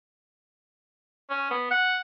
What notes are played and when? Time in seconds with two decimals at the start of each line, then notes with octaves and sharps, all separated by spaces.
1.30 C#4
1.51 B3
1.71 F#5